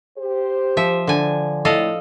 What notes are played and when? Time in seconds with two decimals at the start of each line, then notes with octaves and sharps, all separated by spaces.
0.18 G4 C5
0.77 F3 E5
1.07 D3 G#5
1.65 A2 A4 D#5 F5